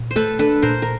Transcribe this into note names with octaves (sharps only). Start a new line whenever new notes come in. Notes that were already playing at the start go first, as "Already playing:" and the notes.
Already playing: A#2
C5
A3 A4 B4
D4 A4 B4
A#2 A#4 C5
A#4